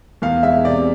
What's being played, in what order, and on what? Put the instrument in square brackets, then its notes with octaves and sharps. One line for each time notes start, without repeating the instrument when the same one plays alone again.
[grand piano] E2 F5
G#3 E5
C3 D5